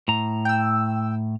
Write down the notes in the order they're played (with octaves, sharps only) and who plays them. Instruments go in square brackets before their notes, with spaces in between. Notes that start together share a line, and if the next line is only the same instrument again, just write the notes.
[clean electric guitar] A2 A#5
[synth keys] G5 E6